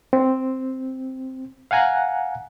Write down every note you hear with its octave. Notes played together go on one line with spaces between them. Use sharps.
C4
F5 F#5 G#5 A#5 F#6